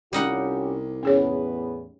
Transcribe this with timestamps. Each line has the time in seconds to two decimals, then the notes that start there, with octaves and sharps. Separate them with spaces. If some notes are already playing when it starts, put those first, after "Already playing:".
0.13 C2 G3 C#4 D#4 F4 G4 F#5
1.03 E2 A2 B3 C#4 G#4 C#5